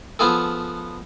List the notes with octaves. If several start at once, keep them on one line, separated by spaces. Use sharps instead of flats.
F3 B3 F4 G#4 A4